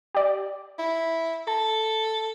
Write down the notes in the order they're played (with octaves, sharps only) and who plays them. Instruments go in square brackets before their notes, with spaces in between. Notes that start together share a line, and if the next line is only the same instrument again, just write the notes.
[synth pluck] G4 D5
[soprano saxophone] E4
[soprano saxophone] A4 [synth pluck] A5